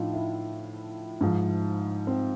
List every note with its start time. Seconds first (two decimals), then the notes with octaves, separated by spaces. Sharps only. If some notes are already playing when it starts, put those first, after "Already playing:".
Already playing: A2 F3 D4 D#4 F4
0.14 E4
1.21 G#2 F3
2.07 C4